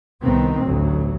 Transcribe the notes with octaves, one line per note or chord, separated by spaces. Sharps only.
C2 D#3 B3 C4
A1 D2 F#3